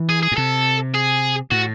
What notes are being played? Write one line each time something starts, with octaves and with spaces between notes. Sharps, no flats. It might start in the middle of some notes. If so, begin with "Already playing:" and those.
Already playing: E3
G#4
G#4
A2
C3 A4
G#4
A2 F#4